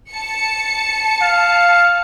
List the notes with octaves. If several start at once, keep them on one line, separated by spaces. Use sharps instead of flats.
A5 C#7
F5